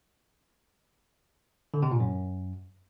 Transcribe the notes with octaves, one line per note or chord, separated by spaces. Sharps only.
D3
C3
A#2
F#2